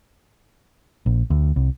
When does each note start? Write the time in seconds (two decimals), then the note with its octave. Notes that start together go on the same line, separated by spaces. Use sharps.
1.06 A#1
1.30 D2
1.56 C2